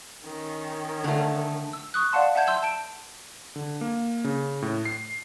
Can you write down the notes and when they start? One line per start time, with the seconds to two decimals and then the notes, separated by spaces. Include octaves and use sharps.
0.24 D#3 C#4
1.04 D3 A3
1.73 E6
1.94 C#6 D#6 F#6
2.12 D5 F5 F#5 A5 C6
2.35 E5 F#5 A5 G6 G#6
2.47 C6 E6 G6
2.63 A5 D7
3.56 D3
3.81 A#3
4.24 C#3
4.62 A2
4.85 C7